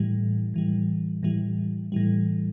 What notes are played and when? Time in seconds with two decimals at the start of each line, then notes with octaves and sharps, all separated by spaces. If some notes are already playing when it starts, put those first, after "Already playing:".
Already playing: A2 E3 G3
0.54 A2 E3 G3
1.23 A2 E3 G3
1.92 A2 E3 G3